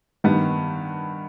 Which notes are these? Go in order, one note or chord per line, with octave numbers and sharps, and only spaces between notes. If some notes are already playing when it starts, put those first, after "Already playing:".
G2 D#3 G3 B3